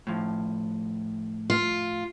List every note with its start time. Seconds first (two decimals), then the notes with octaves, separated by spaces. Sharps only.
0.07 A2 F3
1.50 F4